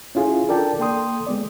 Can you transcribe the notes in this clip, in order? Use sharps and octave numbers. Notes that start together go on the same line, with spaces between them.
C#4 E4 F4 G#4
D4 A4 A#4 D5 G5 A5
A#3 A4 G5 C6 D#6
G#3 B3 D5